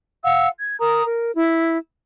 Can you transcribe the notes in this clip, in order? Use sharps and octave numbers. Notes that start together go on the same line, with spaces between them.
F5 F#5 E6
G#6
A#4 A#5 D#6
A#4
E4